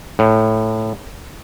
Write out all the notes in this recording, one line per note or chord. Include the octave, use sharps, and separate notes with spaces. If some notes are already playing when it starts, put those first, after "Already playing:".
A2